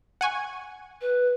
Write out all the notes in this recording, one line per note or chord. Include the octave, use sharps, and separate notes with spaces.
F#5 G#5 C#6
B4